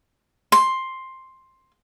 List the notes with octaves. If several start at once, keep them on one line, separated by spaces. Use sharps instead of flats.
C6